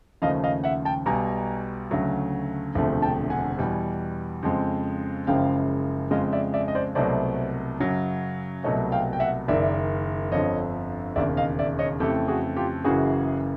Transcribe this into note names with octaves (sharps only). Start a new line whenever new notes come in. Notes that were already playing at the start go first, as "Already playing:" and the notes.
D#2 C#3 F3 A3 D#5 F5
D#5 F5
E5 F#5
G5 A5
B1 B2 G3 G#5 A#5
D2 C#3 F#3 A3
E1 D2 C3 F3 A3
G5 A5
F#5 G#5
E2 B2 G3
F2 C#3 F3 G#3
F#1 F#2 C#3 F3 G#3 F5 G5
F2 C#3 F3 G#3 D#5 F5
D5 E5
D5 E5
D#5
C5 D5
C2 B2 F#3 A3 C5 D5
F#2 C#3 F#3
C2 B2 F#3 A3 C#5 D#5
F5 G5
G5
E5 F#5
F#1 F#2 D#3 D5 E5
G1 F2 D3 F3 C#5 D#5
E1 D#2 C#3 D5 E5
D#5 F5
D5 E5
C#5 D#5
F2 C#3 E3 A3 G4 A4
F#4 G#4
F4 G4
F#1 F#2 C#3 E3 F#4 G#4